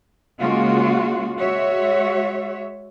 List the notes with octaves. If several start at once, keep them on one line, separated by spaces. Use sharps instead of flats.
C#3 G#3 A#3 F4 F#4
G#3 F#4 C#5 E5